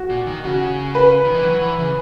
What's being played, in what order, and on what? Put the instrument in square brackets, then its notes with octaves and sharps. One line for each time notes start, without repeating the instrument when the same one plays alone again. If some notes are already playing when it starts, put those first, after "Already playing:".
Already playing: [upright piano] F#4
[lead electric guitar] A#2
D#3
[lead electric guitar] C#3 [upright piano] F#4
[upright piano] B4
[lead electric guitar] D#3
E3
F#3
E3
C#3